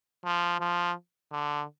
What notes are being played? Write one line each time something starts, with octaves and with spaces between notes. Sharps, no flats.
F3
F3
D3